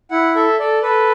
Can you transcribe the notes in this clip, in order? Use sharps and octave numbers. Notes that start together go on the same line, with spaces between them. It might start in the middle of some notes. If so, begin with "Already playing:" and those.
E4 F#5
A4 E5
A4 D5
A4 B4